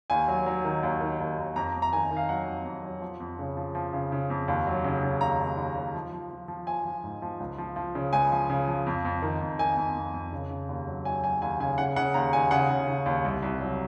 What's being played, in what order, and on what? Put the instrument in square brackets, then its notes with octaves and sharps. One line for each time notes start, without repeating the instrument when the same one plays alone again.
[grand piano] D#2 G#5
F#3
F#3
D#3
D#2
D#3
D#2
D#2
F2 A#5
F2
A#5
D#3 G#5
D#3
F5
F#3 F#5
F2
F2
F#3
F3
F2
C#3
F3
F3
C#3
C#3
F2
D#2
F#3
C#3
C#3
D#2 A#5
D#2
D#2
D#2
F3
F3
F3
F3
F3 G#5
F3
G#2
F3
C#2
F3
F3
C#3
C#2 G#5
F3
C#3
F3
F2
F2
D#3
F2
D#3 G#5
F2
F2
F2
C#3
C#3
D#2
F#3
F#3 G#5
F#3 G#5
D#2 G#5
C#3 G#5
C#3 F#5
C#3 F#5
D#2 A#5
D#2 G#5
C#3 F#5
C#3
C#3
D#2
C2
C2
F#3